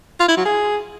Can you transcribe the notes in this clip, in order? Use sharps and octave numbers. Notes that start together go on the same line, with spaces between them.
F4
E4
F#3
G#4